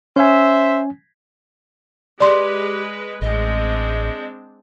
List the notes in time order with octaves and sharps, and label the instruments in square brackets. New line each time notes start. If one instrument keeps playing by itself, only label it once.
[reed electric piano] C#4 G#5 [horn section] C5 E5
[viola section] G#3 B4 [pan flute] G4 [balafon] D5 C6
[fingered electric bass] A1 [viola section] G#3 C4 D4 [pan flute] D#5